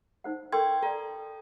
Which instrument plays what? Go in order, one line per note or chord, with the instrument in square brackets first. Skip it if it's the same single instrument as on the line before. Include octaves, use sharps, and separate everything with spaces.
[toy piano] D#4 C5 F#5
[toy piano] A4 A#4 C#6 [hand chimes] G5 C6 G#6
[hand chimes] A4 [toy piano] D5 A#5